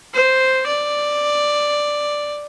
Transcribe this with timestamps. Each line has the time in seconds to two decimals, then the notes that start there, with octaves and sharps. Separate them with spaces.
0.14 C5
0.67 D5